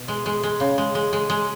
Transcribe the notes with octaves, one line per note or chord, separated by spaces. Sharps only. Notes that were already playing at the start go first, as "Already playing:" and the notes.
Already playing: B2
G#3
G#3
G#3
C#3
G#3
G#3
G#3
G#3